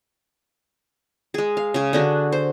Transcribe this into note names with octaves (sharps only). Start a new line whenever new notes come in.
G#3 G#4
F5
C#3 G#4
D3 D4 F#4
C5